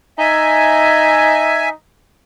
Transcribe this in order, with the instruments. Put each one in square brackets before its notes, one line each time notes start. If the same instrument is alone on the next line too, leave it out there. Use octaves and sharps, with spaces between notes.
[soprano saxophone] D#4 [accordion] E5 G#5